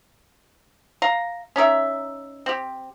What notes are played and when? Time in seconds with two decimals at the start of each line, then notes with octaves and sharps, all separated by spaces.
1.02 F5 A#5
1.56 C#4 D#4 A#4 E5
2.46 C4 G4